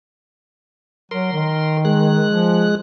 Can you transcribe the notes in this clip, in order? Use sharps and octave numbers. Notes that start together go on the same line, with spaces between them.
F#3 A#4 C6
D#3
G#3 F#6
F3